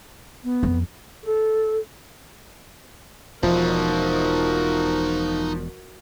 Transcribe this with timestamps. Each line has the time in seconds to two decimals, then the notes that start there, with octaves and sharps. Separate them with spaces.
0.44 B3
0.63 F2
1.24 A4
3.43 E1 F3 D#4 F#4 A#4 E5